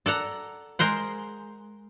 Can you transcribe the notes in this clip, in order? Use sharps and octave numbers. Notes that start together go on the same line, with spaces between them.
A4 D5 F#5 A#5
G#3 A#4 C5 F#5